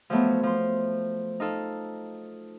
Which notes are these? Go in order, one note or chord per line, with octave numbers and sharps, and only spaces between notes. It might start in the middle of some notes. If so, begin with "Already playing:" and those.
F3 F#3 A3 B3
F3 C6
D#4 F4 A4